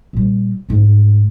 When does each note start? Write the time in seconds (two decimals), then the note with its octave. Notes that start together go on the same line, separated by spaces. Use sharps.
0.13 A#2 G3
0.69 D2 G#2